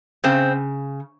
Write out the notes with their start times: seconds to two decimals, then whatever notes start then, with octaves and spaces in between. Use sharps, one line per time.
0.24 C#3 C4